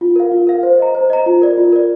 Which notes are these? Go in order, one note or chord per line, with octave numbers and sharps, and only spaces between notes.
F4
A#4 F5
F4
A#4 F5
C5
D#5 A#5
C5
D#5 A#5
F4
A#4 D5
F4
A#4 D5